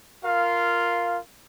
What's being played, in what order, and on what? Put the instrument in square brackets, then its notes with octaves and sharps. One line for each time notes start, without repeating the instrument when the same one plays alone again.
[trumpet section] F4 A#4 F5